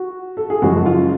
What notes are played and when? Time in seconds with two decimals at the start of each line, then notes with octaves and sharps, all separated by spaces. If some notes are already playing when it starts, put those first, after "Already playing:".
Already playing: F#4
0.37 A4
0.50 G#4
0.62 F#2 C#3 F3 G#3 F#4
0.86 F4